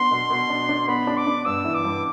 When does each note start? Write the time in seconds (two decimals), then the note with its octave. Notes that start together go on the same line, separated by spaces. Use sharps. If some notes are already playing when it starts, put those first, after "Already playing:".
Already playing: B3 D4 C6
0.11 B2
0.30 B2
0.50 D4
0.69 D4
0.88 B3 B5
1.07 D4
1.18 D6
1.27 D4
1.45 G2 E6
1.65 E3
1.75 D6
1.84 G2